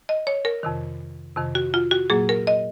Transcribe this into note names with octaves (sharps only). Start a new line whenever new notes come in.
D#5
C#5
A#4
F2 C3 D#3
F2 C3 D#3
F#4
F4
F#4
A#2 F#3 A#3 G#4
A#4
D#5